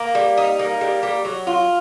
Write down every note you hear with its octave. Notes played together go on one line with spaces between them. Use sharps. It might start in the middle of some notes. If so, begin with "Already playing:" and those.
Already playing: A#3
G3
D#4
A#3
G3
G3
F#3
F4